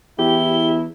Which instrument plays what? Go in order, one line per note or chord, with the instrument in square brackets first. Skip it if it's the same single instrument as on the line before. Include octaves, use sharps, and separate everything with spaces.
[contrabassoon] E2 [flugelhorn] E4 [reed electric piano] G4 [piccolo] G7